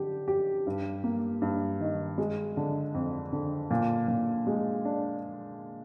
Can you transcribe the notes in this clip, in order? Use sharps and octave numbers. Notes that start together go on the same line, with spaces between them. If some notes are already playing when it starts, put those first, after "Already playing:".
Already playing: D3 G4
G4
G2
A#3
G2
D#3
G#3
D3
F2
D3
A#2
A#2
G#3
D4